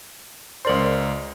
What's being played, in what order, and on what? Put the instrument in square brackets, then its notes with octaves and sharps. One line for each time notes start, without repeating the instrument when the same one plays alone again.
[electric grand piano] C#2 A#4 C6 [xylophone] C5 D5 F#7